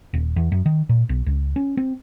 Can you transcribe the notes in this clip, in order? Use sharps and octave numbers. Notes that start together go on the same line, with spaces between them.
D#1
E2
F#2
D#3
A#2
B1
C#2
C#4
C4